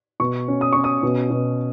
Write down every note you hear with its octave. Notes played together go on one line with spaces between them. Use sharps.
B2 C#6
C#4
D#6
C#4 C#6
D#6
B2
B2